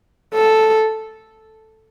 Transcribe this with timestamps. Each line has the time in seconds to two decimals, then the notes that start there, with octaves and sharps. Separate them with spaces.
0.34 A4